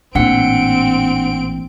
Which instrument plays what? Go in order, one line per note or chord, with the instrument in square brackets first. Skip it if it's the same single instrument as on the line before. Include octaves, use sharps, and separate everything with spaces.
[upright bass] A1 A#2 [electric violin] C4 D7 [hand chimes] D4 F#5 C#7